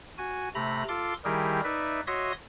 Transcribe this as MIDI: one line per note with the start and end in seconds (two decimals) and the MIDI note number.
0.18 0.49 66
0.18 0.49 80
0.55 0.84 48
0.55 0.84 57
0.55 0.84 82
0.55 0.84 83
0.88 1.14 65
0.88 1.14 69
0.88 1.14 84
0.88 1.14 86
1.25 1.61 51
1.25 1.61 55
1.25 1.61 64
1.25 1.61 67
1.25 1.61 68
1.25 1.61 70
1.64 2.01 63
1.64 2.01 71
1.64 2.01 74
1.64 2.01 76
2.07 2.32 66
2.07 2.32 73
2.07 2.32 75
2.07 2.32 76
2.07 2.32 84
2.07 2.32 87